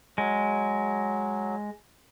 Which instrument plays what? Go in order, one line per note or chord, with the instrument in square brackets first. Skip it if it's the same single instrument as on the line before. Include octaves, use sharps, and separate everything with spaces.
[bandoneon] F#3 [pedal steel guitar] G#3